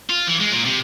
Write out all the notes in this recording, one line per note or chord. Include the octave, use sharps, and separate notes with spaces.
F4
E3
G#3
A#2
C3